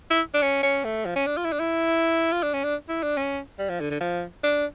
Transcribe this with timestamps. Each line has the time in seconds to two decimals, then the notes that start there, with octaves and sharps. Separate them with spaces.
0.10 E4
0.34 D4
0.42 C#4
0.63 C#4
0.84 A3
1.06 F3
1.15 C#4
1.26 D4
1.37 F4
1.44 E4
1.52 D4
1.59 E4
2.32 F4
2.43 D4
2.53 C#4
2.64 D4
2.89 E4
3.03 D4
3.17 C#4
3.59 G3
3.69 F3
3.80 D3
3.90 D3
4.00 F3
4.43 D4